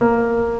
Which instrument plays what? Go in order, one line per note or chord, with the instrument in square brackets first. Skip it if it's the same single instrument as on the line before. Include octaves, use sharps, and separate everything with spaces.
[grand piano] A#3